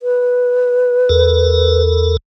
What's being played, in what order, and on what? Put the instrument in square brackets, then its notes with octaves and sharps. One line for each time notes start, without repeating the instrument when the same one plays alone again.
[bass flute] B4
[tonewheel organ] E2 A4 A#4